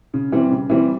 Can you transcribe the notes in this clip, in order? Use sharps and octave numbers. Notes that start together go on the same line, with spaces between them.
C#3
E3 G3 C4
C#3
E3 G3 C4